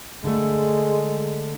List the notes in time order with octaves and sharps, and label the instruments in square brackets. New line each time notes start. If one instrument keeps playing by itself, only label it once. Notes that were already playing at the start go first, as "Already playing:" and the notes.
[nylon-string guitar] D3 A3 [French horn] G#3